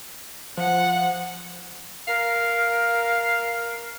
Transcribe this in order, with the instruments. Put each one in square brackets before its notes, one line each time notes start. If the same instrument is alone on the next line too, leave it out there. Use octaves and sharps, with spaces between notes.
[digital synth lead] F3 [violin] F#5
[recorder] A#4 [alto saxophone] F5